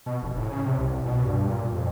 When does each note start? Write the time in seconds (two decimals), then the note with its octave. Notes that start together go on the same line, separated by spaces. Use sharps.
0.06 B2
0.23 F1
0.37 A2
0.50 C#3
0.66 C3
0.78 C2
1.05 B2
1.26 G2
1.48 A#2
1.72 F2